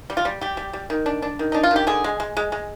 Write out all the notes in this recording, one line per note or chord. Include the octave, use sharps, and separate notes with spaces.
G3
F4
G3
G3 G4
G3
G3
D#3
D4
D4
D#3
D4 D#4
F4
D#3 G4
D3 G#4
G#3
G#3
G#3
G#3